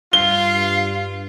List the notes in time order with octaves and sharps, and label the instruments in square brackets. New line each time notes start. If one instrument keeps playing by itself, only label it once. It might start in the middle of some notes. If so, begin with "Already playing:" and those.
[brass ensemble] G2 [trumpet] F4 [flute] F5 [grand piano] G7